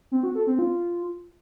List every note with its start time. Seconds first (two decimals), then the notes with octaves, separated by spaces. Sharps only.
0.12 C4
0.23 F#4
0.35 A4
0.47 C4
0.59 F4